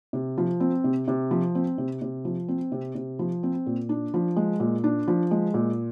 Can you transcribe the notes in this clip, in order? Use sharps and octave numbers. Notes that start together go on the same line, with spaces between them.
C3
F3
C4
C3
C3
F3
C4
C3
C3
F3
C4
C3
C3
F3
C4
A#2
D4
F3
G#3
A#2
D4
F3
G#3
A#2